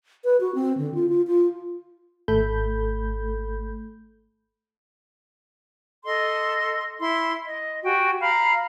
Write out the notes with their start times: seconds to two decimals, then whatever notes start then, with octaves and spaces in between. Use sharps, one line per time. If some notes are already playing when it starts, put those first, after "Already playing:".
0.24 B4
0.40 F#4
0.55 C4
0.78 D3
0.94 F4
1.09 F4
1.27 F4
2.28 G#1 A3 A4 B5 G6
6.05 A4 D#5 C6
7.00 E4 C6
7.44 D#5
7.83 F#4 G4 G5 G#5
8.20 F5 A#5 B5 F6